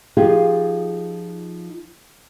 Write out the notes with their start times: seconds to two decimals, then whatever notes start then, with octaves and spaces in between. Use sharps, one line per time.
0.17 F3 D#4 F4 G4 G#4 F5